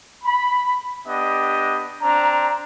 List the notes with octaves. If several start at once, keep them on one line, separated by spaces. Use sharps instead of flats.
B5
B3 D4 G4 D#5
C4 D4 A#5